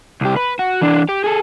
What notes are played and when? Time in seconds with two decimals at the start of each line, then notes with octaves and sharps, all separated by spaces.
0.21 C2 G4
0.36 B4
0.59 F#4
0.81 E3 D4
1.09 G4
1.24 G#4 A4